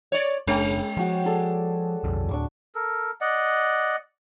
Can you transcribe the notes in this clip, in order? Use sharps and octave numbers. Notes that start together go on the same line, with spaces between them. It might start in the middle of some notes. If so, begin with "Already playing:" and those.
C#5 D5
F#1 G#3 C#4 D4 G5
F3 F#4 G5 C#6
G#4 A4 D5
B1 F2
D1 D4 C#6 D6
A4 A#4
D5 D#5 F#5